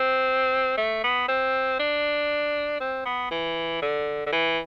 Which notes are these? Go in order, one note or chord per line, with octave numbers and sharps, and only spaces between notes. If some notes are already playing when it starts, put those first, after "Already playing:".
Already playing: C4
A3
B3
C4
D4
C4
B3
E3
D3
D3
E3